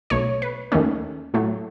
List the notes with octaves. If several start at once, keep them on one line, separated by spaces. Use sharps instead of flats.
B1 B2 A3 C#5
B4
D#2 D#3 A3 C#4
A2 F#3 A3